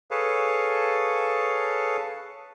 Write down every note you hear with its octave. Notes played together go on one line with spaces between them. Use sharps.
G#4 A4 B4 C#5 F5 A5